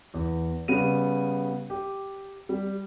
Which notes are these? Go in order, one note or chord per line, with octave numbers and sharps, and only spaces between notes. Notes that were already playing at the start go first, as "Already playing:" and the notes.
E2
C#3 G3 B3 D#7
G4
G3